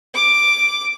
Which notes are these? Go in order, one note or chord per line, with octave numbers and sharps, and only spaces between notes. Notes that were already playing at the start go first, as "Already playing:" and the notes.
D6